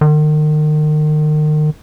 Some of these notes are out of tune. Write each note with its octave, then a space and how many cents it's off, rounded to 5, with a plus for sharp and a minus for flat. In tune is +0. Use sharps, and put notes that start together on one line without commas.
D#3 -35